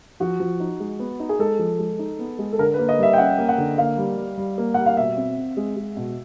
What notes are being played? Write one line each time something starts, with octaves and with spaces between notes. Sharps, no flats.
F3 F#4
F3
D#4
G#3
B3
D#4
G#4
G#3 A4
F3
G#3
D#4
B3
G#3
A4
D3 A#4
B4
A#3
D#5
G3 E5
G5
C#4 F#5
A#3
F#5
D3
A#3 F5
G3
G3
G3
A#3
G3 F#5
F5
B2 E5
C4
C4
G#3
G#3
B2